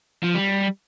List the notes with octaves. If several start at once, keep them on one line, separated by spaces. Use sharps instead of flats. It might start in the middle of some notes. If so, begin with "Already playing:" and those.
F3
G3